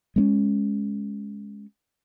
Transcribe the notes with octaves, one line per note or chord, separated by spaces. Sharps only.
G#3 A#3 C#4